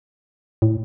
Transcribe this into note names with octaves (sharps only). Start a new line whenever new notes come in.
A2